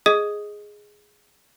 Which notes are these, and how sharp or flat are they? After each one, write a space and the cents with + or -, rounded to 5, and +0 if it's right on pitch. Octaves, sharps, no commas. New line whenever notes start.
G#4 +0 D#5 +0 D#6 +0